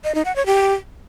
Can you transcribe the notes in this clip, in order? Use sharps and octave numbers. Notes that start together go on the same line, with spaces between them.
D#5
D#4
F#5
C#5
G4